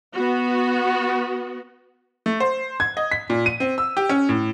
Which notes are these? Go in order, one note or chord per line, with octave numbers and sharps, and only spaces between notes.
B3 F#4
A3
C5
G#6
D#5
B6
A#2
D#7
C4
E6
G4
C#4
A2